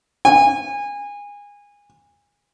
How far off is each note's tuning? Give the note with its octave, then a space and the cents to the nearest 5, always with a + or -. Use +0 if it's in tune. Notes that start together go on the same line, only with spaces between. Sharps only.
G#5 -25